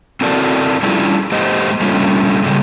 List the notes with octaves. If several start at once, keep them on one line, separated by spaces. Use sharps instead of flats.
C4 E4 F#4 A4 A#4 D5
G3 C#4 D4 E4 F4 G#4
G#3 A#3 G4 C5 D#5
G3 A3 A#3 C#4 D4 F4
A#2 C#3 G3 G#3